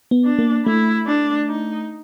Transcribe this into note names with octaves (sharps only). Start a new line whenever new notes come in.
B3
D4
A#3
A3 E4
D4
D#4